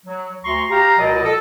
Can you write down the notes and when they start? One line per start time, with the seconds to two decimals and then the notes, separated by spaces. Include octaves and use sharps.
0.06 F#3
0.44 D2 A#5 C6 C#6
0.70 G4 F5 A#5
0.98 C#2 B2 F#3 A#4 D5 D#5
1.24 A4